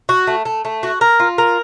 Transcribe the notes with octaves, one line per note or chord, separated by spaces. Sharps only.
F#4
A3
A3
A3
F#4
A#4
F4
A#4